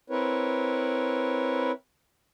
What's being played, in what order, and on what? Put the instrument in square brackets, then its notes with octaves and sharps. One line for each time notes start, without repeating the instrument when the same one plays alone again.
[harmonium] C4 E4 A#4 B4 C#5